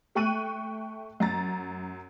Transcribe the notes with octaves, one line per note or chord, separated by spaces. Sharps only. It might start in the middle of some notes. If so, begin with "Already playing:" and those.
A3 G5 C#6 F#6 D#7
F#2 A#5 A6